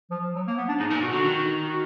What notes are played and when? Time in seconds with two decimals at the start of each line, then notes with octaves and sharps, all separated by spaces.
0.11 F3
0.35 F#3
0.47 A#3
0.57 B3
0.68 D4
0.80 G#2 D#4
0.90 A#2 D#4
1.02 B2 F#4
1.13 D3 F#4
1.24 D#3
1.68 F#4